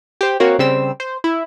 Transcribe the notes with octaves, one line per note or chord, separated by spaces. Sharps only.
G4 C5
A#3 C4 F#4 C#5
C#3 G3 C4 E6
C5
E4